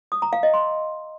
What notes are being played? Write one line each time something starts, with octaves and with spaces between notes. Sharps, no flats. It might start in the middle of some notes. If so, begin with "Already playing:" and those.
D#6
A#5
F5
D#5
C6